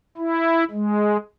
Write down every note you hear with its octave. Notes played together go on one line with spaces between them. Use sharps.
E4
G#3